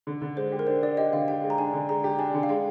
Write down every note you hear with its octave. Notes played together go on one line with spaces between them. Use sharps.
D3
D3
G#3 C5
G4
A#4
D4 C5
D4 D5
G4 D#5
D3 F5
G4 G5
G#3
A#5
D4 G#5
D3
G#3 A#5
G4
D4 G#5
D3
F5
G#3 G5